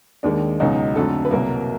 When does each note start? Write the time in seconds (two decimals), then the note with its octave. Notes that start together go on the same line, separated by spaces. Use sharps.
0.23 D#2 D#3 G#3 D4
0.60 C#2 B2 F#3 D#4
0.95 F2 D3 F#3 A3 A4
1.25 B4
1.31 C2 B2 F#3 A#3 A#4